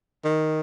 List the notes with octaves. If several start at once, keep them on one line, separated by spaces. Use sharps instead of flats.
D#3